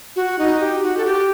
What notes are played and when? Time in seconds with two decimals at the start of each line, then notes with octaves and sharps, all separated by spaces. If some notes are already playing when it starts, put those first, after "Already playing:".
0.16 F#4
0.39 D#4
0.60 G4
0.83 F#4
0.97 A4
1.05 G4